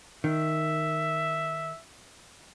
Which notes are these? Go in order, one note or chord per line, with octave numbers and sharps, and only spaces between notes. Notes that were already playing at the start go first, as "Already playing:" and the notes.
D#3 E5